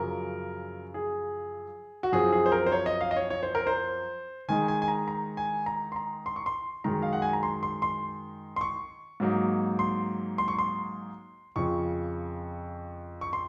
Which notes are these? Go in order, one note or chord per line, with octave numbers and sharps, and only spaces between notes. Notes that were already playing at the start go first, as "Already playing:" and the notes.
Already playing: F#2 C#3 F3 A#4
G#4
F#4
F#2 F3 C4 G#4
G#4
C5
A#4
C5
C#5
D#5
F5
D#5
C#5
C#5
C5
A#4
C5
D#3 G#3 D#4 G#5
G#5
G#5
A#5
A#5
G#5
A#5
C6
A#5
C6
C#6
C6
F#2 D#3 G#3 D#4 A#5
F5
F#5
G#5
A#5
C6
C6
C6
C6
C#6
G#2 F#3 A#3 D#4
C6
C6
C#6
C6
F2 C#3 F3 C#6
C#6
C6